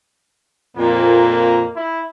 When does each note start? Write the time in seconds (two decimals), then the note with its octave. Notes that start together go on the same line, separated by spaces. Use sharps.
0.77 F2 A#2 A#3
1.76 E4